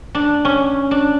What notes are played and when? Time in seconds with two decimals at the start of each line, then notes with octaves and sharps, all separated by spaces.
0.15 D4
0.45 C#4
0.91 D4